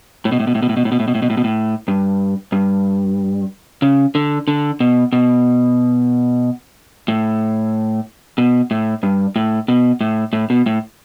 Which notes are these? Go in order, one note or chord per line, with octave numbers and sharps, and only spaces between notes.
A2
B2
A2
B2
A2
B2
A2
B2
A2
B2
A2
B2
A2
B2
A2
B2
A2
G2
G2
C#3
D3
D3
B2
B2
A2
B2
A2
G2
A2
B2
A2
A2
B2
A2